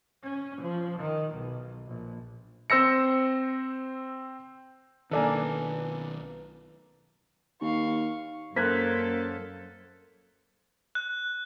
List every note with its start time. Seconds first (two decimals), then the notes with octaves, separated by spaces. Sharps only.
0.23 C#4
0.62 F3
1.00 D#3
1.35 B1
1.88 A#1
2.70 C4 C5 E6 A#6 C#7
5.11 B1 D#3 A#3 D4 A4 B4 G#5
7.62 D#2 F5 C#6
8.56 F#2 A#3 A4 C5 F#6 G#6 B6
10.95 F#6